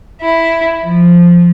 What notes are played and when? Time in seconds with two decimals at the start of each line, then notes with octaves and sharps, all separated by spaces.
0.21 E4
0.82 F3